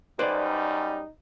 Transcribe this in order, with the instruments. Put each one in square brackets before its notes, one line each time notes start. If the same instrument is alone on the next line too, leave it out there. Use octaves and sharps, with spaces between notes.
[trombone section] F#2 G3 [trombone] D#4 [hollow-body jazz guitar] B4 C5 D5